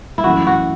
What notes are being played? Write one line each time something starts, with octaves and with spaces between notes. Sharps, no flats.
E4
F#2 E3 A3 F#4
F#4